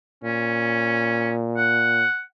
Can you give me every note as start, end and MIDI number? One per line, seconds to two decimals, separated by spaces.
0.24 2.05 46
0.24 1.31 61
1.57 2.21 78